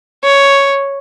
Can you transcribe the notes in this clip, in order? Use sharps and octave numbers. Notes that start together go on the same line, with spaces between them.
C#5